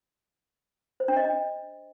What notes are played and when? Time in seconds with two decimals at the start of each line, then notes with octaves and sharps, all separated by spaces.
1.00 C5
1.08 D4
1.17 D#5
1.25 D4